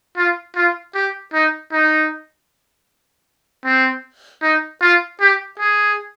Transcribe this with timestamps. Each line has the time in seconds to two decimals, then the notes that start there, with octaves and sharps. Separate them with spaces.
0.17 F4
0.56 F4
0.95 G4
1.33 D#4
1.72 D#4
3.65 C4
4.42 D#4
4.81 F4
5.20 G4
5.59 G#4